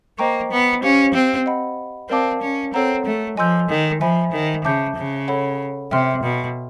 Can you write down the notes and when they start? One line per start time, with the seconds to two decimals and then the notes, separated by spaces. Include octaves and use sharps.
0.19 A#3 C5 D#5 G5 A#5 C#6
0.52 B3
0.83 C#4 G4 C5 F5
1.14 C4
1.46 D#5 F#5 B5
2.10 C4 A#4 D5 F5 A5 D6
2.42 C#4
2.73 C4 A4 C#5 F#5 A#5
3.05 A3
3.37 F3 D#5 G#5 C6 E6 G6
3.69 D#3
4.01 F3 C5 E5 G#5 B5
4.32 D#3
4.65 C#3 E5 A5 D6 G6
4.96 C#3
5.28 A4 C#5 F#5 B5
5.91 C3 E5 G5 C6 F6
6.23 B2